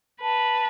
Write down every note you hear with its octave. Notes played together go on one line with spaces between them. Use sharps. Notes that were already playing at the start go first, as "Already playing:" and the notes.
B4 A5